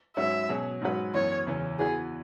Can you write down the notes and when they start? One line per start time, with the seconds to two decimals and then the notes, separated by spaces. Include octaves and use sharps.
0.16 G#2 F#3 C#4 F#4 B4 E5
0.49 B2 F#3 C#4 G#4
0.81 G#2 F#3 C#4 F#4 B4
1.14 F#2 E3 B3 C#5
1.47 E2 C#3 E3 C#4
1.79 E2 E3 B3 F#4 G#4 B4